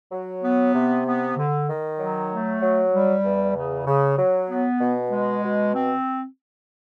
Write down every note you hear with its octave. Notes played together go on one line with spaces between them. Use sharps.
F#3
B3
C3
B3
D3
D#3
F#3
A3
F#3
G3
E2
C#3
C#3
F#3
B3
B2
G#3
B2
C4